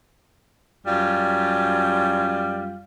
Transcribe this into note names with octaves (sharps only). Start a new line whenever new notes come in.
F#2 G3 F4